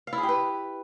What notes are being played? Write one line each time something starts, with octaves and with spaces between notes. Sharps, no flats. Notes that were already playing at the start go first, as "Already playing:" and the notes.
F5
E4
G#4
G4
B4